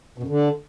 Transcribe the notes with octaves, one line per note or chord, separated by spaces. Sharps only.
B2
F#2
D3